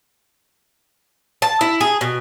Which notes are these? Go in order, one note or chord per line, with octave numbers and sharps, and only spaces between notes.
A5
E4
G#4
B2